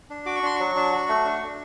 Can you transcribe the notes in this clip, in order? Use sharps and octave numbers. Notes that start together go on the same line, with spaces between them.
D4
F#4 D6
C#6
D4 C6
F#3 C#6
D4
F#4
A3
D4
D4